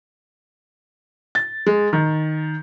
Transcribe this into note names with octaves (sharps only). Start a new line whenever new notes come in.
A6
G#3
D#3